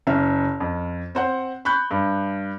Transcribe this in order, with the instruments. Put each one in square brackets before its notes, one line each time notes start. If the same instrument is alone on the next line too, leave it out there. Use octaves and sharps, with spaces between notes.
[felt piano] F#1 C#4 E5 F6
F2
C4 C5 F#5
B5 C#6 F#6 G6
G2